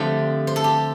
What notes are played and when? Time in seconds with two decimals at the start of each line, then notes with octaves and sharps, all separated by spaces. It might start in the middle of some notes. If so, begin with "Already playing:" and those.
Already playing: D3 F3 A3 C4 G4 C5
0.47 C5
0.56 A4
0.64 G4